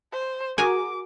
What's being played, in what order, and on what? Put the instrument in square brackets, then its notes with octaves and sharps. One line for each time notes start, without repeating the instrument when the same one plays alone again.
[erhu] C5
[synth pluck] F#4 G#4 A#4 [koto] G#5 [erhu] D6